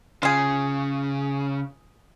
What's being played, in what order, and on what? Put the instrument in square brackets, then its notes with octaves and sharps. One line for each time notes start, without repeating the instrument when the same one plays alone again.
[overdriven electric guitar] C#3 [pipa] F4 G#4